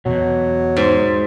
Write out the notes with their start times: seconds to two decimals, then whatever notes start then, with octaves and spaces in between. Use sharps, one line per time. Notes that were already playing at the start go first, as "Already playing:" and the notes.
0.06 E2 B2 F#3
0.77 G#2